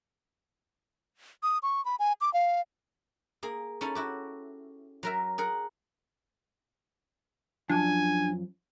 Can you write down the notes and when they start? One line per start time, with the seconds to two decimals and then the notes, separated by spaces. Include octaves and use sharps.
1.43 D#6
1.63 C#6
1.85 B5
1.99 G#5
2.21 D6
2.34 F5
3.43 A#3 G#4
3.81 C#4 D#4 E4 A4
3.95 E4 F#4 G4
5.03 F#3 A#4 E5
5.38 G#4 A#4 F#5
7.69 F#2 F3 D4 G#5